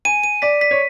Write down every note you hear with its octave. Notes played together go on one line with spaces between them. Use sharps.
G#5 D#7
D#7
D5 B6
B6
C#5